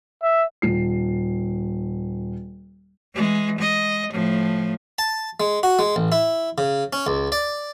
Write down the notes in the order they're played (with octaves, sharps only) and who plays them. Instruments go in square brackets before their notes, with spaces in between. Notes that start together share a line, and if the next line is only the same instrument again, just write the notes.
[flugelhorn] E5
[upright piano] D#1 C7
[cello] E3 G#3
G#3 D#5
A2 F3
[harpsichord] A5
G#3
F#4
G#3
A1
E4
C#3
C#4
C#2
D5